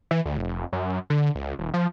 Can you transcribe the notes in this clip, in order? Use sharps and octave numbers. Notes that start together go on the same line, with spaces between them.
E3
D2
F1
F#2
D3
C#2
D#1
F3